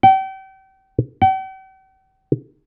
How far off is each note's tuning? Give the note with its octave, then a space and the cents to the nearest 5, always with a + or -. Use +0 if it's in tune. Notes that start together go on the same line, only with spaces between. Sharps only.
G5 -35
G5 -45